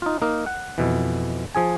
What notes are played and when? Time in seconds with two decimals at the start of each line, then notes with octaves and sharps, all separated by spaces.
0.02 D#4 F4
0.22 A#3 D#4 A#4
0.46 F#5
0.78 F2 B2 E3
1.55 F3 G#4 G#5